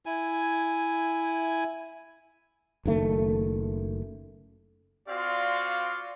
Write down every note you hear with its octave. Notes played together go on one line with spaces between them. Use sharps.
E4 G#5
F#1 D#3 A3
C4 F4 F#4 D5 F5 C6